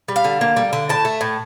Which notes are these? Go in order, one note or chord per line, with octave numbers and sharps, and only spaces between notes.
G3
F5
D3
A#3
G3
D3
A2 A5
A3
A2